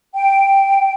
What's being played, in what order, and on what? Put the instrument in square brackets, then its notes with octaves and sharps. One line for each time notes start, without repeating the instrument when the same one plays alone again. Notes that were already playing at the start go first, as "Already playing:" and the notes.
[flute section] G5